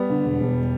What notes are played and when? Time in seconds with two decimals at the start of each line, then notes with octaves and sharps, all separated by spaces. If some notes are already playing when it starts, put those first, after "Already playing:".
Already playing: G3 B3
0.10 D3
0.24 E1
0.40 E1